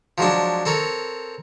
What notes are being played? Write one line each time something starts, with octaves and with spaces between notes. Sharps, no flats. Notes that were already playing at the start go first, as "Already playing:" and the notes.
F3 F#3 G#3 D4
C4 A4 A#4 C#5